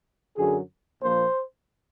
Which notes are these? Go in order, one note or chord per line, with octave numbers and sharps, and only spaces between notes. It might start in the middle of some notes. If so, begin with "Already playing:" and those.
F#2 D3 F#3 G#4
A#1 A#2 F3 A#3 C5